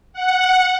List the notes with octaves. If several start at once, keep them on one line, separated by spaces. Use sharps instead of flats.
F#5